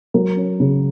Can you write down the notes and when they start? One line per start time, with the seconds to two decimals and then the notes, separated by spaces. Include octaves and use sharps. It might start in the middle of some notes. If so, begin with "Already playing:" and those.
0.14 F#3 A#4
0.37 C#4
0.60 C#3